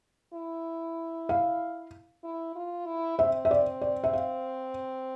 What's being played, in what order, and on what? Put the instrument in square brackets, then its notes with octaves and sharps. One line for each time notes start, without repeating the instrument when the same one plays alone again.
[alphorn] E4
[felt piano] F5
[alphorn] E4
F4
E4
[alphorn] C4 [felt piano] E5
[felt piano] E5
D5
D5
E5
F5